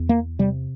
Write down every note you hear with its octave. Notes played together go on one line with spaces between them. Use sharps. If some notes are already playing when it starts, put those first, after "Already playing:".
Already playing: E2
A#3
C3 G3